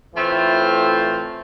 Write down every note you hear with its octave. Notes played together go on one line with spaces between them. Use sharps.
A2 E3 A3 C4 F4